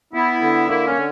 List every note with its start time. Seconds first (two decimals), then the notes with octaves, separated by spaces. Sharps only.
0.14 B3 E4
0.41 D3
0.68 A#3 E4
0.86 C#4
0.96 D3